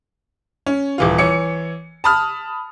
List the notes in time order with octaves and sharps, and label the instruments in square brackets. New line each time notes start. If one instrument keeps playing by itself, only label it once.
[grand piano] C#4
D#1 E3 F4
E3 C#5 C#7
A5 B5 D#6 F6